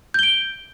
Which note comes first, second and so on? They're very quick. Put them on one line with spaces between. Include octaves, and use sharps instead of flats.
G6 G7 D7